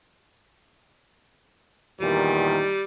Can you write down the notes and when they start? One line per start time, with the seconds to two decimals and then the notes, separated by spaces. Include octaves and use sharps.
2.01 E2 A#2 D#3 G3